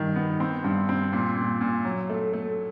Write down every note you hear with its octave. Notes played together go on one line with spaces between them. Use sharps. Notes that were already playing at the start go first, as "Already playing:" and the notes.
Already playing: G2 D#3
B3
C4
G2
C4
A#2
A#2
A#2
F#3
A3
A3